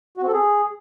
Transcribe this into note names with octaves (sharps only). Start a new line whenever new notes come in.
F#4
C4
A4
G#4